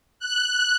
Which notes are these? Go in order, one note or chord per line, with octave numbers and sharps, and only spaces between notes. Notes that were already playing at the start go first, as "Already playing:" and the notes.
F#6